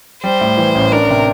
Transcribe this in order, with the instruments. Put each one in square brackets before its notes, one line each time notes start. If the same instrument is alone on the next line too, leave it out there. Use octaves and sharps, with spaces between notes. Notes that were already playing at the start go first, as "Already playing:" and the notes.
[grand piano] G3 [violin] C5
[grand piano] A2
E3
A1
[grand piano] D4 [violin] A#4
[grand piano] C3